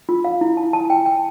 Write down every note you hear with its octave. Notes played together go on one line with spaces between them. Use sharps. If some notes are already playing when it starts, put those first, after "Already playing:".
F4
F5
E4
A5
A5
G5
G5